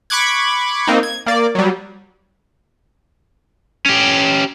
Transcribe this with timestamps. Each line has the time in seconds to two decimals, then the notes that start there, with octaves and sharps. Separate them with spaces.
0.10 B5 C#6 D6 F#6 G#6
0.87 A#3 C4 D#4
1.03 G#6
1.26 A#3 D5
1.55 F#3 G3
3.86 C#4 G4